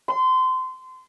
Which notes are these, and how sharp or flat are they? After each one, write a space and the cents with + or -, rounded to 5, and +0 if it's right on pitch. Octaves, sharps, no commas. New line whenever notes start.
C6 -25